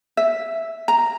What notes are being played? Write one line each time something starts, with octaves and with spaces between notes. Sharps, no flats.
E5
A#5